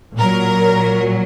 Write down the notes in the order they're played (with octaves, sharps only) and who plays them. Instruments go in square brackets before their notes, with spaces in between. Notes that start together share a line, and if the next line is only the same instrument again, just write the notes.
[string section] A#2 F#3 A#4